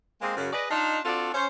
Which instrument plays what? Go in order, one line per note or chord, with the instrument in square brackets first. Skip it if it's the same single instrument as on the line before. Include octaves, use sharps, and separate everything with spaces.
[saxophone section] G#3 A#3 C4
F#2 C#3
G#4 B4 D5 D#5
D4 D#4 F4
C4 D4 F4 F#4 A4 D5
C#4 C5